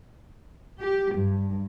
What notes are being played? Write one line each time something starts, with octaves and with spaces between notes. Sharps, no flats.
G4
G2